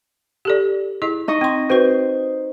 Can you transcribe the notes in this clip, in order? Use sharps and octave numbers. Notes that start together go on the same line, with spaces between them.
G4 A4 D5
E4 G#4 D#5
D#4 D#5 C#6
C4 C6
C4 F#4 B4 C5